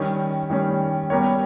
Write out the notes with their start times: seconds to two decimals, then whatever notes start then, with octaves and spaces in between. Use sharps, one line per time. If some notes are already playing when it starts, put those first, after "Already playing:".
Already playing: D#3 G3 C#4
0.50 D#3 G3 C#4
1.10 G3 B3 G4 A#4 C#5